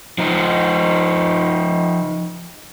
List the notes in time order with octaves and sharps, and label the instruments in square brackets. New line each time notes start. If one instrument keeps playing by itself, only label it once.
[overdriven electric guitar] F3 D#4